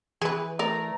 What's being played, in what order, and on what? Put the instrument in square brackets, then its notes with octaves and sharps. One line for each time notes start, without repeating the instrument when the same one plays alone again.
[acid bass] E3 [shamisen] G#4 B4
[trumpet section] A3 A#5 [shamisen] A#4 D5